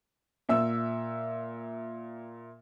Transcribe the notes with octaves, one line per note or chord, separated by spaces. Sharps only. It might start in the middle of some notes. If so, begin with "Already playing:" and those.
A#2 E5 E6